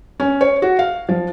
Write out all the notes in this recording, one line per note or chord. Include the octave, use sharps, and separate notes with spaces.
C#4
C#5
F#4
F5
F3